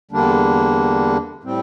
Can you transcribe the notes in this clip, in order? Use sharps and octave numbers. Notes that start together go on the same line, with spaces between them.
E2 D3 G3 A#3 D4
A2 G3 C4